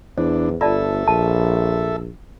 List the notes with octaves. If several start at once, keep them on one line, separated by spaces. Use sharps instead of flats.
E2 E3 D4 C5
G1 F4 A4 D5 E5 A5
A#1 A5